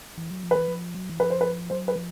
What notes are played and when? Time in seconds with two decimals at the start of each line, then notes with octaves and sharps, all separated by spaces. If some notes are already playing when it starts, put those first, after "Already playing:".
0.17 E3
0.30 F#3
0.43 F3
0.51 E3 B4
0.68 F3
0.95 F#3
1.09 E3
1.20 F3 B4
1.30 C5
1.41 B4
1.70 F#3 C5
1.88 B4
1.96 F3